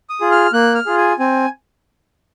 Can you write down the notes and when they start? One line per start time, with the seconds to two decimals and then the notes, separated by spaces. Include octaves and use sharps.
0.10 D#6
0.21 F4 G#4
0.31 F6
0.53 A#3 F#6
0.75 F6
0.86 F4 G#4
0.98 G#5
1.19 C4 G#5